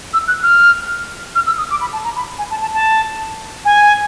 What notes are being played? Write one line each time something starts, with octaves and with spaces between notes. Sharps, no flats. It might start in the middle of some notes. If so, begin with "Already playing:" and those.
E6
F#6
F6
F6
E6
D#6
D6
B5
A5
A#5
B5
G#5
A5
A5
A5
G#5